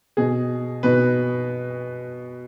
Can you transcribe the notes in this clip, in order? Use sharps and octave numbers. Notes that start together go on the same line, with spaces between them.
B2 G#4
B2 B4